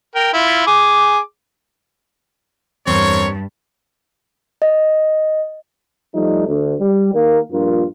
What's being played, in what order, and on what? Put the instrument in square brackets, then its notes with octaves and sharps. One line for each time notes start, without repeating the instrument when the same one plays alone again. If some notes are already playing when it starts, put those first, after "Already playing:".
[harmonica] A#4 G5
E4 F4
G#4 D6
[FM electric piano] E2 [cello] G2 [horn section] C4 A#4 C#5
[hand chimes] D#5
[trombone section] F3 G3 A3 D#4
D2
G3
D#2 A#3
A#1 G2 F4 A#4